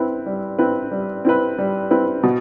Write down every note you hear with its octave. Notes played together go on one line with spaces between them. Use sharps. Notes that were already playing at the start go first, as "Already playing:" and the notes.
Already playing: C4 E4 B4
G3
C4 E4 B4
G3
C4 E4 B4
G3
C4 E4 B4
B2